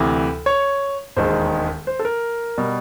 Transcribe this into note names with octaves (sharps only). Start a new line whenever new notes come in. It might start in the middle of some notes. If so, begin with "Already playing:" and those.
Already playing: D2 C3 E3
C#5
E1 D#2 D#3 G#3 C5
C5
A4
A#4
B2 G3